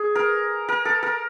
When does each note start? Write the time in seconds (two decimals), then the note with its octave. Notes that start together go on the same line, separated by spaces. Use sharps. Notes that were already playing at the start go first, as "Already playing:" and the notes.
Already playing: G#4
0.15 A#4
0.69 A#4
0.85 A4
1.03 A#4